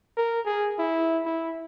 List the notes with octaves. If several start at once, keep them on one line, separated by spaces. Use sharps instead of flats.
A#4
G#4
E4
E4